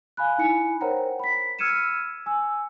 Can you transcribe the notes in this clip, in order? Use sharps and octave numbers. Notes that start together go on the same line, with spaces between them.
F5 G#5 B5 F#6
D#4 E4 G#5 C#7
A#4 C5 C#5 F#5 G5 A#5
B5 B6
E6 F6 G#6 C#7 D#7 E7
G#5 E6